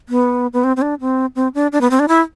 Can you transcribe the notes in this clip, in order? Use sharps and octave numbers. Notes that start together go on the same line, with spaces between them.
B3
B3
C4
C4
D4
C4
C4
D4
D4
B3
C4
D4
E4